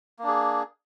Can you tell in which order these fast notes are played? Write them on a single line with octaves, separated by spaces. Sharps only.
A#3 D4 G#4